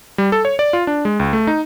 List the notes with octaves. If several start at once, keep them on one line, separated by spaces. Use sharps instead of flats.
G3
A4
C#5
D5
F4
D4
G#3
C#2
A3
D#4